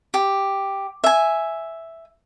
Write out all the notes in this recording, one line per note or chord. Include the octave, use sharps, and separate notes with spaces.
G4
E5 G#5